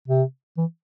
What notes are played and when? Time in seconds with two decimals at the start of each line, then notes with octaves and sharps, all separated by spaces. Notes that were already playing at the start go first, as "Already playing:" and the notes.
0.08 C3
0.57 E3